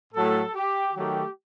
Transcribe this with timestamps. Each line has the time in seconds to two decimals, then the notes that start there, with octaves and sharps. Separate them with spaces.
0.14 A2 F#3 A3 A4
0.53 G4
0.94 D#3 F#3 A3 G4